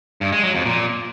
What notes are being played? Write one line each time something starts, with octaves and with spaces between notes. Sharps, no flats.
G2
G#3
F#3
F2
A#2